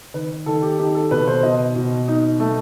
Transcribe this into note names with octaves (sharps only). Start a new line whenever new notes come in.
D#3 B4
D#3 A4
G4
D#4 G4
A4
B2 B4
C5
B2 D#5
B2
D#4
A3